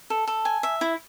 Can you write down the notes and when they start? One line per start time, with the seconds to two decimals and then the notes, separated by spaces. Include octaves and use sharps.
0.10 A4
0.27 A4
0.45 G#5
0.63 E5
0.81 E4